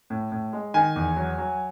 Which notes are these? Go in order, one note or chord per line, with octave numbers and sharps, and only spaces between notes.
A2
A2
G#3
D#3 G#5
E2
F#3
F#3